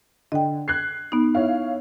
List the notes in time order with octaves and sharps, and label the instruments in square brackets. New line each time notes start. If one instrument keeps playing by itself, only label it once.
[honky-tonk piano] D3 [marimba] D#5 G5
[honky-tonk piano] F#6 G#6 C7
[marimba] B3 D#4
[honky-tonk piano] E4 C#5 F5